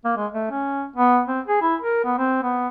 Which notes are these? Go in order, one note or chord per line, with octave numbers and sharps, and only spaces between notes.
A#3
G#3
A3
C#4
B3
C4
G#4
E4
A#4
B3
C4
B3